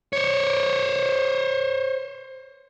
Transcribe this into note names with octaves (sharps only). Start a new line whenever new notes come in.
C5 C#5